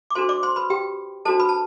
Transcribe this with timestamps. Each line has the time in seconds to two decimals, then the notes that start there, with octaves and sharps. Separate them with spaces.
0.10 D6
0.15 D4 F#4 A4 C5 C6
0.29 D5 D6
0.43 C5 C6
0.56 B4 B5
0.70 G4 G5
1.25 D4 F#4 A4 C5 A5
1.40 B4 B5
1.49 A5